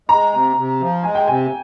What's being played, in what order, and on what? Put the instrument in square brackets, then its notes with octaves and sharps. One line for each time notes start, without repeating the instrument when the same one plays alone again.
[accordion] G#3 [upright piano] A#5
[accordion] C3
C3
F3
[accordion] G#3 [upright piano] G#5
[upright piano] G5
[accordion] C3 [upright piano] G#5